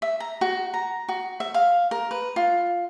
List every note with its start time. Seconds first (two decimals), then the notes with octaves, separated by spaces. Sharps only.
0.02 E5
0.20 A#5
0.41 F#4
0.74 A#5
1.09 F#4
1.40 E5
1.54 F5
1.91 A#4
2.11 B4
2.36 F4